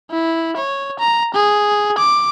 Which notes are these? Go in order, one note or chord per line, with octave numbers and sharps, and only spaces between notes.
E4
C#5
A#5
G#4
D6